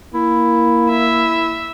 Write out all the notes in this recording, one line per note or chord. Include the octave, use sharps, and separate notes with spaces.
A#3 E4
E4 E5